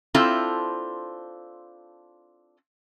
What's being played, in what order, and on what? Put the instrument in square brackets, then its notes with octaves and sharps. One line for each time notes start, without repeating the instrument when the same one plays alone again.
[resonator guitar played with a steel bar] C4 D4 E4 F4 A4 C5